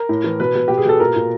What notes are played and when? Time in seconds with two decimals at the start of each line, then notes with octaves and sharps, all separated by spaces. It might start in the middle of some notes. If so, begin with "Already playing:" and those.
Already playing: A#4
0.09 A2
0.24 E3
0.40 B2 B4
0.55 B2
0.68 B2 G4
0.78 G#4
0.86 B2 A4
1.00 A#2 A#4
1.16 A#2